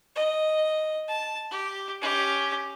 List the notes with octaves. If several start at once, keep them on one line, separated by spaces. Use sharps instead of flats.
D#5
A5
G4
C#4 G4